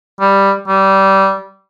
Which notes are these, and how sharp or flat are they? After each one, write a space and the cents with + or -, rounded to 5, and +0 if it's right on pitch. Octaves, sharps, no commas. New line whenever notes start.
G3 +5
G3 -20